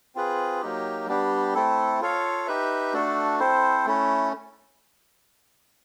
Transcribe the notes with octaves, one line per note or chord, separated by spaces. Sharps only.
C4 F4 G#4 B4
F#3 A#3 D#4 G4
G3 B3 D4 G4
A3 C4 E4 A4
F4 A4 C#5 F5
D#4 G4 B4 E5
A3 D4 F#4 A4
C4 E4 A4 C5
A3 C#4 E4